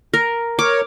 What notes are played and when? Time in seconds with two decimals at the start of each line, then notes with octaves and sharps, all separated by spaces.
0.14 A#4
0.59 A#4 C#5 D6